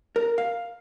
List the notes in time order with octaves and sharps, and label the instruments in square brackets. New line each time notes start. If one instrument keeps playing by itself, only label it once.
[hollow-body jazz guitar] A#4
F5